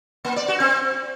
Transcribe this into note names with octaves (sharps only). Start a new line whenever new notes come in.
A#3
D5
F#4
C4